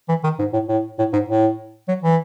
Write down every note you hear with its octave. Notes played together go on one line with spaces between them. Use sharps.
E3
D#3
G#2
A2
A2
A2
G#2
A2
F#3
E3